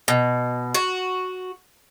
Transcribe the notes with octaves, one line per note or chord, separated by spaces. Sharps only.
B2
F#4